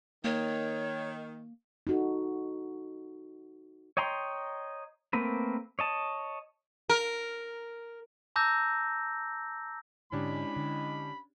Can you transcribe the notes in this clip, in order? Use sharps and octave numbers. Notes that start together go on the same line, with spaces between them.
D#3 A#3 C#5
D#4 F#4 A4
C#5 D#5 G5 A#5 C6
A3 A#3 C4 A#4 B4
C#5 D#5 A5
A#4
A5 A#5 D6 E6 G6 A#6
G#2 D3 G#3 C#4 D4 E4 G4 B5
D3